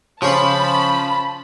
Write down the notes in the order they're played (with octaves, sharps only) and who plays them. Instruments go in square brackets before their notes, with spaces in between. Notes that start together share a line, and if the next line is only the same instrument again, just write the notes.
[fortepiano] C#3 [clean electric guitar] F3 [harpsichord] C#4 C5 C#5 [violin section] A5 B5